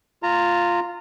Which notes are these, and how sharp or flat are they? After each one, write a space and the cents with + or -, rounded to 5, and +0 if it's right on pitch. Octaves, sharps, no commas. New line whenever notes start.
F4 +0 A#5 -20